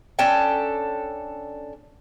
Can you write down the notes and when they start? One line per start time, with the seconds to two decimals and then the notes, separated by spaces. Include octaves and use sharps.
0.19 C#4 D4 A4 G5